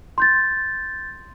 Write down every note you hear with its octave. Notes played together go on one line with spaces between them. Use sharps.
C6 G6 A6